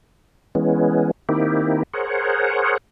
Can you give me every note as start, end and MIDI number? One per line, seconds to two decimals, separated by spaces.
0.55 1.11 52
0.55 1.11 56
0.55 1.11 59
0.55 1.11 61
1.29 1.83 51
1.29 1.83 58
1.29 1.83 60
1.29 1.83 63
1.29 1.83 64
1.29 1.83 67
1.93 2.78 68
1.93 2.78 70
1.93 2.78 72
1.93 2.78 73
1.93 2.78 78